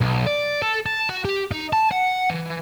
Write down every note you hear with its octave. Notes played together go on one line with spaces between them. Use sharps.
B1
D5
A4
A5
F#4
G4
D#4
A5
F#5
E3